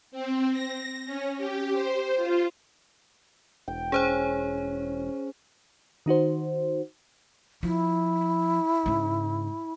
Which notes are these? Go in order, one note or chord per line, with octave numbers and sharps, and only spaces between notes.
C4
A#6
C#4
G4
C5
F4
E1 G5
C#4 G#4 C5 C#5 G#5
D#3 D#4 F#4 C5
F3 E4
G#2 C#3